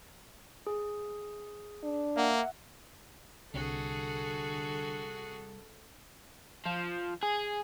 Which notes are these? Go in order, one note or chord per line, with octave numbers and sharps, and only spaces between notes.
G#4
D4
A#3 E5 F#5
C2 D3 F#4 G#4 A4
F3
G#4